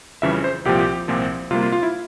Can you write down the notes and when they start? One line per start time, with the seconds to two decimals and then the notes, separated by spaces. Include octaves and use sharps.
0.22 F2 C#3 E3 G3 C#4 E5
0.44 C5
0.65 C2 A#2 F3 C4 G4
1.08 C2 A#2 F3 C4
1.51 C3 G3 A#3 F4
1.62 F4
1.72 F4
1.83 E4